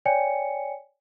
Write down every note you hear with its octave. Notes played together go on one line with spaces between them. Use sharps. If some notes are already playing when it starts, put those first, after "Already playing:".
C#5 D5 G5 G#5 C#7